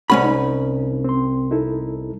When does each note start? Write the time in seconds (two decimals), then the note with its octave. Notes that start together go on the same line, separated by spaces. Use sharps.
0.10 C2 G#3 C#4 F#5 B5 C#6
0.24 D#4
1.04 C4 C6
1.51 D#4 E4 A4